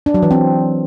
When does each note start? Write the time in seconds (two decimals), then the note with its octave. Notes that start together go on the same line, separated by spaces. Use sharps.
0.06 D4
0.14 F#3
0.22 E3
0.31 C4